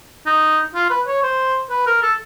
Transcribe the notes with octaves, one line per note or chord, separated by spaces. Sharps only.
D#4
F4
B4
C#5
C5
B4
A#4
A4